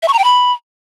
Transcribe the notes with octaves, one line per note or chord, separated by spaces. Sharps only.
E5
C#6
A#5
G5
B5